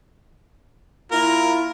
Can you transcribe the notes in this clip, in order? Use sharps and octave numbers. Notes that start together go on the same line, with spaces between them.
A#3 E4 F4 A#4